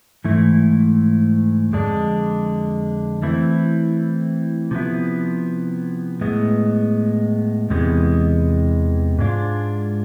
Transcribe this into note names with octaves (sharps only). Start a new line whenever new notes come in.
G#2 E3 A3 E4
F2 D3 G#3 D4
E3 A3 C4 E4
C3 F3 B3 E4
A2 G#3 B3
E2 C3 E3 G#3 B3
G#2 G#3 D4 F4